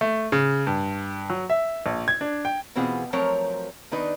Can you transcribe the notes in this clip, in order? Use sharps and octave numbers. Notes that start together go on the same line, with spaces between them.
A3
C#3
G2
F#3
E5
A#1
G#6
D4
G5
B2 E3 C4 F4 G#4 F#5
F3 F#3 A3 C4 A#4 C#5
D#3 D4 D#4 B4